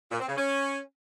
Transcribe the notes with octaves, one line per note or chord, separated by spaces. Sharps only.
A#2
C4
C#3
C#4